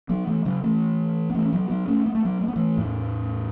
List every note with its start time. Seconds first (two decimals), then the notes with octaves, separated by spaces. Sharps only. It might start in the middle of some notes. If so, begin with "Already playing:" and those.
0.09 F#3 B3
0.27 E3 A3
0.45 C#3 F#3
0.63 E3 A3
1.30 B3
1.35 E3 A3
1.45 C#4
1.53 F#3 B3
1.70 F#3 B3
1.88 A3 C#4
2.06 B3
2.15 A3
2.25 F#3 B3
2.41 A3
2.48 B3
2.56 E3 A3
2.77 E2 A2